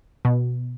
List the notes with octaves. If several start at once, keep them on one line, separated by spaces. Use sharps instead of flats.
B2